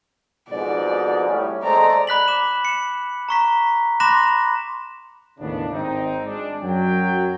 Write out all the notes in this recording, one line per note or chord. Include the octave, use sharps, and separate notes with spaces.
F2 G#2 B2 D5
A2 G3 C#4
G#3 A3 C4 D5 A#5
B5 F#6 B6 F#7
D6 E7
C#7 E7
A#5 C#6 B6
B5 C6 D6 F#6 A#6 E7
D#2 A2 C#3 B3 D4
G#1 C4 D#4
G#3 D4
F#2 F#3 G5